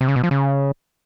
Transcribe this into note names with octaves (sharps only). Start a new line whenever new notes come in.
C3
C#3
B2
F3
C#3